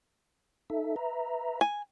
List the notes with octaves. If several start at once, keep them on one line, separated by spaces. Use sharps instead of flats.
D#4 A4 E5
B4 E5 A#5
G#5